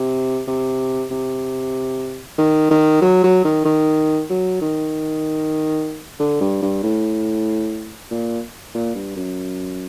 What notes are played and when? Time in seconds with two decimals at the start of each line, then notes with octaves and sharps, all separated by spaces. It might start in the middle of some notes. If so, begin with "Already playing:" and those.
Already playing: C3
0.48 C3
1.11 C3
2.38 D#3
2.71 D#3
3.02 F#3
3.24 F#3
3.45 D#3
3.65 D#3
4.30 F#3
4.61 D#3
6.20 D3
6.41 G2
6.62 G2
6.83 A2
8.11 A#2
8.75 A#2
8.95 G2
9.16 F#2